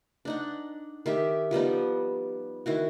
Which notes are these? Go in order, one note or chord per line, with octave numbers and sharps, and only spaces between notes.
D4 D#4 F#5
D#3 G4 E5
F3 G3 B3 D#4
D#3 E4 F#4